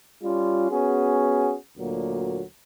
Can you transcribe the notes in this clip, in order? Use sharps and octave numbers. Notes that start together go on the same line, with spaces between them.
G3 C#4 F4
B3 C#4 F#4 G#4
D2 A#2 F#3 A#3